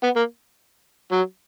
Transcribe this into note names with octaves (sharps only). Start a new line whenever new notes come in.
B3
A#3
F#3